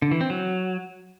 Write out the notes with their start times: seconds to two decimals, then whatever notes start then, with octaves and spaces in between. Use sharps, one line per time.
0.02 D3
0.11 E3
0.21 C4
0.30 F#3